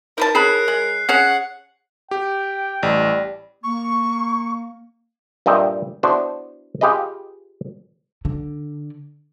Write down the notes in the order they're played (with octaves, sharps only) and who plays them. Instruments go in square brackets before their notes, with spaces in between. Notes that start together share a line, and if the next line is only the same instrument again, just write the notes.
[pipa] D#4 B4 A5 [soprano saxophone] A#4
[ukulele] G#4 C#5 B5 [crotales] F#6 C7
[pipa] G#3
[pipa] C#4 [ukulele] G#4 C#5 [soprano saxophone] F#5 [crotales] C7
[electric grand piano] G4 [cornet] G5
[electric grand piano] A1 [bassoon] G3
[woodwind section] A#3 [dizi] C#6
[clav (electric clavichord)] G2 A#2 D#5 E5 G5
B3 D4 E4 F#4 C5
F4 G4 G#4 B4 D#5
[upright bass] D3